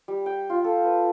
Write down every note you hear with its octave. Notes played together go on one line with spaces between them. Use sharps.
G3
G5
F4
A4
B4